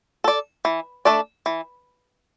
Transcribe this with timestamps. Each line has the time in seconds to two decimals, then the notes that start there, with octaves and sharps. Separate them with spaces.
0.24 A4 D5
0.65 E3
1.05 A3 D4 A4 D5
1.46 E3